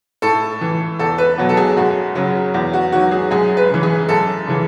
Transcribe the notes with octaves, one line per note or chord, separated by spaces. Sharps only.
A2 A4
E3
E2 A4
B4
B2 F#3
A4
G#4
F#2 F#4
C#3 F#3
E2
F#4
D#3 F#3 F#4
G#4
F#2 G#4
B4
C#3 E3
G#4
F#2 A4
C#3 E3